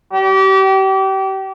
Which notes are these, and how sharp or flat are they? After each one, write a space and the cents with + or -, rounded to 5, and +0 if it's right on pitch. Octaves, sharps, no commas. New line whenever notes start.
G4 -30
G4 -30